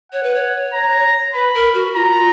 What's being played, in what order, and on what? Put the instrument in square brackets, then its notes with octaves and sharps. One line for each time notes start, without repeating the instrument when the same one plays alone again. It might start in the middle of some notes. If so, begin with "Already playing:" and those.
[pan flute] C#5 [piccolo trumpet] F#5
[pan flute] B4
C#5
[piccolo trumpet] A#5
[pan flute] B4 [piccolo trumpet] B5
[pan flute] A#4
F#4
[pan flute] F4 [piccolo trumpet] A#5